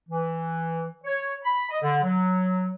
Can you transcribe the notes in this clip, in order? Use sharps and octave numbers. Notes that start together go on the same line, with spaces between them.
E3
C#5
B5
D#5
D3
F#3